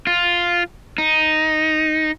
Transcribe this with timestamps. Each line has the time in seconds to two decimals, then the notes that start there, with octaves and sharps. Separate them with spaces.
0.07 F4
0.98 D#4